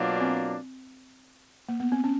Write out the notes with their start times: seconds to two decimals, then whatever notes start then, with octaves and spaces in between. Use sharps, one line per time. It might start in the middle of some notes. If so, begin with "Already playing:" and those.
Already playing: B2 F#3 A#3 D4 F4
0.21 C4
1.69 A#3
1.80 B3
1.92 C4
2.04 C#4